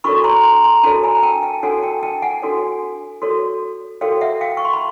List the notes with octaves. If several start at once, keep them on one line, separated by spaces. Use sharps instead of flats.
D4 F#4 A4 C#5 B5 C#6
A#5 C6
A#5 C6
A#5 C6
D4 F#4 A4 C#5 A5 B5
G#5 A#5
G5 A5
G5 A5
D4 F#4 A4 C#5 F#5 G#5
G5 A5
G5 A5
F#5 G#5
D4 F#4 A4 C#5
F#4 A4 C#5
F#4 A4 C#5 F5 G5
E5 F#5
F5 G5
C#6
C6
B5